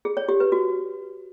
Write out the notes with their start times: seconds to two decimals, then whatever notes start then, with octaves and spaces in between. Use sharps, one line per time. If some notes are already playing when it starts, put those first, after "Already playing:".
0.05 G#4
0.17 C#5
0.29 G4
0.40 B4
0.52 F#4